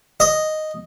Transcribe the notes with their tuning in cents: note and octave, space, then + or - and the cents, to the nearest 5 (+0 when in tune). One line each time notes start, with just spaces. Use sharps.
D#5 -5